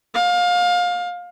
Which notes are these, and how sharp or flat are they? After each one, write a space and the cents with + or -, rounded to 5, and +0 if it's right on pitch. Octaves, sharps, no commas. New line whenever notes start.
F5 +25